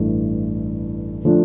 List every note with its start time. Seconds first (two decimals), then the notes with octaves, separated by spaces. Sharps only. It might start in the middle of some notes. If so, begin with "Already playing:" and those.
Already playing: A1 G2 E3 A3
1.25 F3 A3 D4